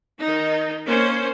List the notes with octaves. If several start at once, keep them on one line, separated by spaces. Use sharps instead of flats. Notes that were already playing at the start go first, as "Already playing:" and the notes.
D#3 D#4
A#3 C#4 C5